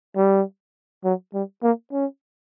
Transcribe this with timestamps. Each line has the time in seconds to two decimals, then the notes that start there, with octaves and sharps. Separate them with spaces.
0.16 G3
1.04 F#3
1.34 G3
1.63 A#3
1.92 C#4